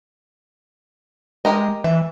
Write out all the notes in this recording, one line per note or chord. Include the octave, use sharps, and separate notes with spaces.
G#3 G4 A#4 D#5
E3 E5